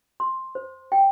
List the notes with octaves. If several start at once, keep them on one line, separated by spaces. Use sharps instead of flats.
C6
C5
G5